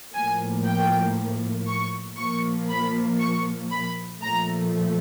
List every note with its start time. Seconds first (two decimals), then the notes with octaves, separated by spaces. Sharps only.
0.14 A2 F3 A#3 G#5
0.65 G5
1.67 C#6
2.18 A#2 F3 A#3 C#6
2.69 B5
3.20 C#6
3.71 B5
4.22 A#2 F3 A3 A#5